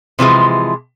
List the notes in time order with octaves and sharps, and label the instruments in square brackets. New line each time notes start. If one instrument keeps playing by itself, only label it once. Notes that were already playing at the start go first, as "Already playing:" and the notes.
[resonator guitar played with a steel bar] C3 E3 F3 G#3